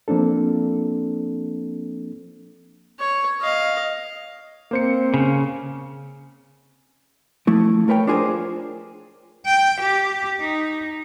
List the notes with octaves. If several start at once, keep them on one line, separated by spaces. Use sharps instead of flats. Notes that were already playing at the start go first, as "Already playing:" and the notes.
F3 A#3 C4 D4 A4
C#5
D#5 F5
A#3 C4 C5 C#7
C#3
F3 A3 E4
A3 A#4 B4 C#5 G5
D4 F4 G#4 A#4 C5
G5
G4
D#4